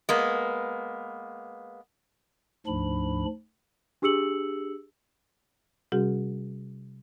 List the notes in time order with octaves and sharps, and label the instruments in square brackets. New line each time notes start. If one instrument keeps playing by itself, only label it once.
[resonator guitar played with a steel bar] G#3 A#3 B3
[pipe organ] D2 G#2 F3 D4 B5
[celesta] D4 G4 G#4 E6 C#7 F#7
[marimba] C3 G3 C#4 F#4 G#4